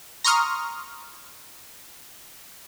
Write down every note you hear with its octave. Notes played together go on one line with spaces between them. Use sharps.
A#5 C6 C#6 D#6 F6